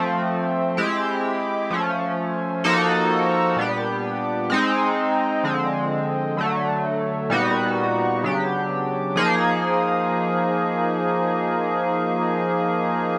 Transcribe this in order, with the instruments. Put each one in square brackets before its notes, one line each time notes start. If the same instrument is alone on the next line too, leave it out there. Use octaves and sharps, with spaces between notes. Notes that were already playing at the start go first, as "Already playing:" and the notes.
Already playing: [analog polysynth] F3 A3 C4
G#3 C4 E4 G4
F3 A3 C#4
F3 A#3 D#4 F#4 A4
A#2 G3 B3 D4 G4
G#3 C4 D#4
D3 F3 G#3 C4
D3 F#3 A3
A#2 G3 B3 D#4 F#4
C#3 F#3 B3 D4 G4
F3 A#3 D#4 G#4